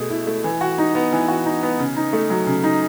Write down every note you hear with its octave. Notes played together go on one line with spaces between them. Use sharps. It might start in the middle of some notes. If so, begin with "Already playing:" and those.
Already playing: B2 A3 G#4
E4
A3
E3
F#4
D#4
B3
E3
F#4
D#4
B3
C#3
D#4
A3
F#3
C#3
D#4